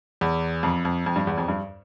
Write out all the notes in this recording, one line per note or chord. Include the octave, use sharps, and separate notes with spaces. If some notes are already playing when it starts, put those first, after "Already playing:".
E2
F2
F2
F2
G2
E2
F2
G2